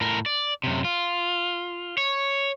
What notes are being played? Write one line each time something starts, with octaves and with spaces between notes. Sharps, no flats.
A2 A#4
D5
F#2 C3
F4
C#5